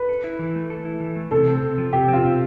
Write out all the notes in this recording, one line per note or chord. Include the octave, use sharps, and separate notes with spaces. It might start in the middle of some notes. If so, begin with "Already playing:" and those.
Already playing: B4
A4
E4
E3
A3
A4
E4
E3
A3
C3 A4
C4
C3
F3
C3 G4
C4 F4
C3